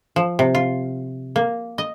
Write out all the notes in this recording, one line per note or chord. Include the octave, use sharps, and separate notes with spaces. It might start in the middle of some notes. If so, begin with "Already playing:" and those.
F3
C3
F4
A#3
D#5